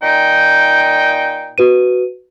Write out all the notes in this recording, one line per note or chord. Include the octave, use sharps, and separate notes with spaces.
A#2 D#4 G5
F#4 B4 D#7